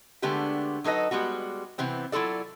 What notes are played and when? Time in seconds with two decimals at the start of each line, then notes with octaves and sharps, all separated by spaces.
0.22 D3 G#3 A3 B3 D4 G4
0.84 F#3 D#4 A4 B4 D#5
1.11 G3 G#3 B3 F#4
1.78 C3 E3 B3 C4
2.12 F#3 E4 F4 A4 D5